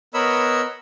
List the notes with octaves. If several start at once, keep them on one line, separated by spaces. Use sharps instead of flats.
B3 A#4 C#5 D#5 B5 E6